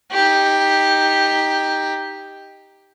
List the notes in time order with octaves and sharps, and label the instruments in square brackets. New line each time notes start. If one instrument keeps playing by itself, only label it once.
[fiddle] D#4 G4